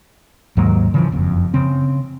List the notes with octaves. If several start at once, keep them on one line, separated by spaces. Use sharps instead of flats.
D#2 G#2 F#3 A#3
C#3 E3 F3
F#1 F2
C#3 C4